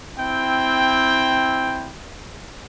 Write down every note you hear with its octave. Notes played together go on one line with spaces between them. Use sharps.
C4 E4 G5